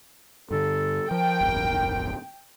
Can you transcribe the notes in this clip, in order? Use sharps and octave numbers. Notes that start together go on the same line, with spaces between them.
G2 D3 A4
F3 A#4 G5
D1 G1 F2